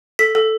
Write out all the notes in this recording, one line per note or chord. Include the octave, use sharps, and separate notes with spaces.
A4 B6
A4